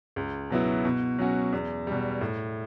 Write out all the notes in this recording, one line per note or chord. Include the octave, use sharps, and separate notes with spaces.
C#2
B2 F#3 B3 E4
B2
F#3 C#4 F#4
E2
B2 G3
A2